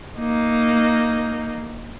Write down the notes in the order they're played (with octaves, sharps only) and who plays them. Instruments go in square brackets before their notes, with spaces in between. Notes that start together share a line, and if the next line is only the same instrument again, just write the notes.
[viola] A#3 D#4